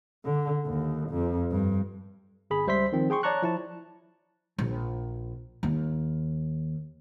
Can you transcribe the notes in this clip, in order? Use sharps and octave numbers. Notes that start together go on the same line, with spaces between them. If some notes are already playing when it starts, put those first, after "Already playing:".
D3
D#2
F2
G2
G1 G#4 B5
C#2 G3 C5 E5 C6 B6
D#3 F3 C4
G#4 G5 C6 C#6
C#5 D5 A5 A#5 C#6 F#6
F3 E4 A5
A#1
D#2